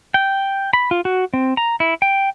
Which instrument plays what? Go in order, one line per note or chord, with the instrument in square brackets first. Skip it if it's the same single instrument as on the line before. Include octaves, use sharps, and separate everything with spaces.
[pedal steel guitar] G5
B5
F4
F#4
C4
A#5
E4
G5